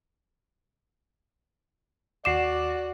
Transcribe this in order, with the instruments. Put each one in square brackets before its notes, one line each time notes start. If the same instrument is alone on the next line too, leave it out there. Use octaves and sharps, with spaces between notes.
[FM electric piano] D#2 D6 [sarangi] F#4 [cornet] D5 [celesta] C7 E7